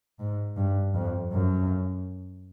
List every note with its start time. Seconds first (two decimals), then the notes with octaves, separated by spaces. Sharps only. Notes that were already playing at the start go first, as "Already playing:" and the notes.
0.19 G#2
0.57 G2
0.94 F2
1.32 F#2